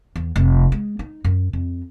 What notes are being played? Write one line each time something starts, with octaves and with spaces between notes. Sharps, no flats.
E2
F1
G#3
D#4
F#2
F2